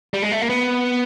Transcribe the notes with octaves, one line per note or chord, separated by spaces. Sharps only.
G3
G#3
A3
A#3
B3